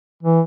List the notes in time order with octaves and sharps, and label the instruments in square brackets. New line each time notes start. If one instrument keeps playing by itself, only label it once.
[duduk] E3